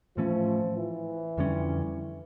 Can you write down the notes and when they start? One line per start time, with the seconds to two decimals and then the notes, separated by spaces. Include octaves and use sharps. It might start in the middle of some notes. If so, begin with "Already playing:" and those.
0.17 A2 E3 F3 A3 C#4
0.77 E3
1.38 F2 D3 G3 C#4